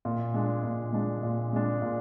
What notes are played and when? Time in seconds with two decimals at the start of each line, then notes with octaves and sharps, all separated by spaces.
0.05 A#2
0.34 G#3 D4
0.64 A#2
0.93 G#3 D4
1.23 A#2
1.53 G#3 D4
1.82 A#2